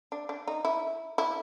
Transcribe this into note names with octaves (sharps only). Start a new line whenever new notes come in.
D4
D4
D#4
E4
E4